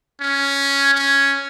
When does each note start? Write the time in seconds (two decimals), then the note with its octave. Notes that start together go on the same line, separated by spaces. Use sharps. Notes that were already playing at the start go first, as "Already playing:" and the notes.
0.21 C#4
0.94 C#4